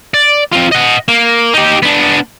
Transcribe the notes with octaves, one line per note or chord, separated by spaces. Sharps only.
D5
C4 F4
D#5 F#5
A#3
D#4 G4
B3 D4